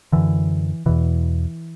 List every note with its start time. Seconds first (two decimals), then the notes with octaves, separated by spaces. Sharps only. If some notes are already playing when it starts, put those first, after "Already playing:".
0.12 F#2 D3 E3
0.86 E2 B2 E3